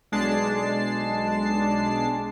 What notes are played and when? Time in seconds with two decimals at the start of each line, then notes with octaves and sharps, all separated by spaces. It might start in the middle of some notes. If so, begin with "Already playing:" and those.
0.12 B1 G#3 D4 A5 C7